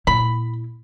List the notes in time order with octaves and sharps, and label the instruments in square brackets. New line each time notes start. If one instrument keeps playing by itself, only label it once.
[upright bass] A#2 E4 [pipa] B5